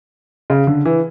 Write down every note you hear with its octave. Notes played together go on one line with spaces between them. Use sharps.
C#3
D3
E3